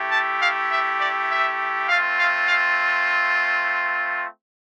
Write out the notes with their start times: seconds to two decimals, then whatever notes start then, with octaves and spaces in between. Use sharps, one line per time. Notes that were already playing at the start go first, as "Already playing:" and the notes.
Already playing: A3 E4 G4
0.11 A5
0.41 F5
0.71 E5
1.01 D5
1.30 E5
1.89 A3 C4 F4 F5
2.19 F5
2.48 F5